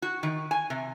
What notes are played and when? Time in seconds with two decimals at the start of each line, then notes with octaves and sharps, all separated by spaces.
0.02 F#4
0.23 D#3
0.51 G#5
0.70 C3